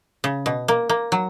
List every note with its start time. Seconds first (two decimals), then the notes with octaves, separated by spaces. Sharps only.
0.24 C#3
0.46 B2
0.68 A#3
0.89 A#3
1.12 F#3